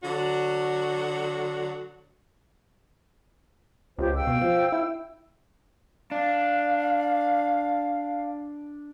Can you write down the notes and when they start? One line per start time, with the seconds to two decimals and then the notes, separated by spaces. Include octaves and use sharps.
0.03 D3 F#3 D4 F#4
3.98 C#2 F4 G4 C5
4.15 F5 G5 E6
4.27 B2
4.41 F3
4.72 E4
6.11 D4 F5